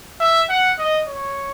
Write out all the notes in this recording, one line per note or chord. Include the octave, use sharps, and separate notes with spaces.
E5
F#5
D#5
C#5